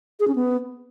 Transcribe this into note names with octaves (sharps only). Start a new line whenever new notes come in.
G#4
C#4
B3